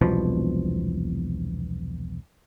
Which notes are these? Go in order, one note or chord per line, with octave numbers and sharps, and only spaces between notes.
E1 C2 B2 F3